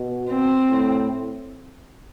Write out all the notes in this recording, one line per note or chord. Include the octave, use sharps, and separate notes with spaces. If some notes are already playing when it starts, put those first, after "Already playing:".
Already playing: B2
C4
A2